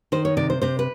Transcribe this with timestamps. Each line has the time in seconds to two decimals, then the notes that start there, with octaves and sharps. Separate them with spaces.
0.12 D#3 C5
0.25 C#5
0.37 C3 D5
0.50 C5
0.62 C3 C5
0.79 B4